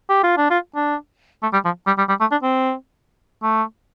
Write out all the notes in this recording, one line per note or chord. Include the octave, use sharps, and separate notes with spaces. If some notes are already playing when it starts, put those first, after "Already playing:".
G4
F4
D4
F4
D4
A3
G3
F3
G3
G3
G3
A3
D4
C4
A3